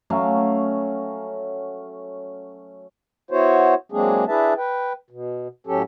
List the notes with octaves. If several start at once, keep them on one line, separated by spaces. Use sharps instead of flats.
F#3 A3 C#4 F5
B3 E4 F#4 C5 C#5
F#3 G#3 A#3 C4 D4 G#4
D4 E4 G#4 B4 E5 A5
B4 G5
B2
A2 F#3 C#4 G4 A4